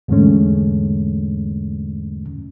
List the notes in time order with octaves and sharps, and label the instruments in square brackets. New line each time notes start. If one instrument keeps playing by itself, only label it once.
[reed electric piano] E2 G#2 D3 G#3 A3 C#4